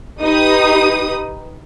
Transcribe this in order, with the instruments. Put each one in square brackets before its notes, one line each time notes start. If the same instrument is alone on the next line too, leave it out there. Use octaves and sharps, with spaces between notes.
[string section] D#4 G4 B4 D#6